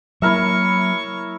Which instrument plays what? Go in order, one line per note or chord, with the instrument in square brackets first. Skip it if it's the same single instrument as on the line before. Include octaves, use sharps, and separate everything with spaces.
[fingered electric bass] F#3 A#3 [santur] E4 A#4 E5 [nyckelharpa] C#5 C#6